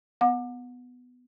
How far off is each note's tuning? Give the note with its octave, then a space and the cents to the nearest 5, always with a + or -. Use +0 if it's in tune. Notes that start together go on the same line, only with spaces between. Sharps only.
B3 +10 F#5 -35 D6 +30